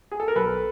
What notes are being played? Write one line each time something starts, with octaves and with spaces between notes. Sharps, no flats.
G#4
A4
A#4
B1 A4 B4